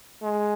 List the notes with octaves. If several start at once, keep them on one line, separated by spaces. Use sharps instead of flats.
G#3